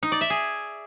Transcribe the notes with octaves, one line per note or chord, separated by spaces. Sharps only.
D#4
D5
E5
G#4